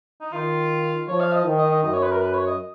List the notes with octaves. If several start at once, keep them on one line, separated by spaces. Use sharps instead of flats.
D#4
D#3 F4
F3 C#5
F5
D#5
D#3
D#5
D#5
F#2 D#5
C#5
B4
A#4
B4
C#5
D#5